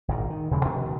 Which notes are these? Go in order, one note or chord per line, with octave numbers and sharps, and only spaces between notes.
G#1 A#2 D#3
D#3
D#2 C#3 E3 G#3
B2 D#3 F3 A3